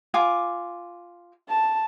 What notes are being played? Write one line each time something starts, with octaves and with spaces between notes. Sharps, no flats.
F4 G#5 D6
A5